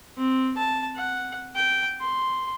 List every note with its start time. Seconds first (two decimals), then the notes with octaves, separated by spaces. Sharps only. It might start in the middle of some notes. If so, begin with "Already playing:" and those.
0.18 C4
0.57 A5
0.97 F#5
1.56 G5
2.01 C6